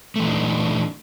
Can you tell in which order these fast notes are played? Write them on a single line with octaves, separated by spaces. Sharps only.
A3 E3 A#2 D4 D#4